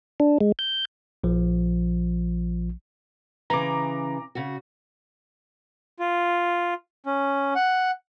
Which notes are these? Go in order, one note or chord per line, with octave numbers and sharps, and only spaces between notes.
D4
G#3
G6
A#1 F3
C#3 E3 A#5 D6
C#3 F#4
F4
C#4
F#5